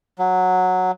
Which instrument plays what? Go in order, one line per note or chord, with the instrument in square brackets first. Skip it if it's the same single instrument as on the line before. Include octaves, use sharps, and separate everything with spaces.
[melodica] F#3